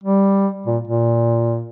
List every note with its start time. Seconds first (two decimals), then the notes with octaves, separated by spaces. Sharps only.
0.04 G3
0.67 A#2
0.88 A#2